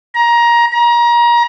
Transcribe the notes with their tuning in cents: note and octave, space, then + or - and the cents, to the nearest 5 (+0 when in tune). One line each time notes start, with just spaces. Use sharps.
A#5 +20
A#5 +30